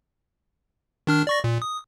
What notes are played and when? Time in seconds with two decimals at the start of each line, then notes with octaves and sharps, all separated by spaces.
1.07 D#3 D4 F6
1.27 D5 C#6 A#6
1.44 A#2
1.62 D#6